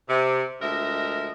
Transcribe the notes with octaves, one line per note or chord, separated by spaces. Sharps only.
C3
D2 F3 G#3 A#4 D#5 E5